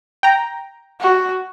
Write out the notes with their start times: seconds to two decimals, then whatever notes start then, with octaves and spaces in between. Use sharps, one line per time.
0.23 G5 A#5
1.00 F#4